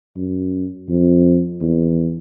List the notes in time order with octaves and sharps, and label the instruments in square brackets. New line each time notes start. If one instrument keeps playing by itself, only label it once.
[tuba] F#2
F2
E2